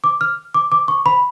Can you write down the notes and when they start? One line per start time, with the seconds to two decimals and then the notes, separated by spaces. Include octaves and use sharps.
0.04 D6
0.21 F6
0.54 D6
0.72 D6
0.88 C#6
1.06 B5